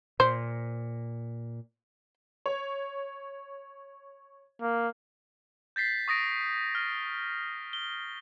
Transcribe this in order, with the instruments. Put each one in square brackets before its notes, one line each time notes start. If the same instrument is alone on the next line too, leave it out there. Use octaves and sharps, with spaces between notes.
[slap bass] A#2 [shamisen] C5
[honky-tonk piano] C#5
[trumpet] A#3
[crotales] G6 A6 B6 C7
C#6 D#6 A#6 D7
F6
G7